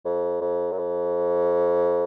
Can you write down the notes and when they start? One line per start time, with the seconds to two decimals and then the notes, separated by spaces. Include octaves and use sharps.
0.05 F2
0.41 F2
0.72 F#2
0.78 F2